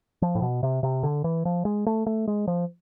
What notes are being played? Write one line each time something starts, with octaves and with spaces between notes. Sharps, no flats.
F3
A2
B2
C3
C3
D3
E3
F3
G#3
A3
A3
G#3
F3